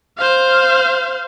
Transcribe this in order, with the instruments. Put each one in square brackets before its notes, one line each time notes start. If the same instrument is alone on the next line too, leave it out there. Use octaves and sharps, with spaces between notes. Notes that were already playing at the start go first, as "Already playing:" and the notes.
[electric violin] C5 F5